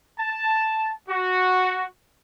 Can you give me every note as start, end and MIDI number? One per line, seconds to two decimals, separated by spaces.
0.18 0.92 81
1.09 1.84 66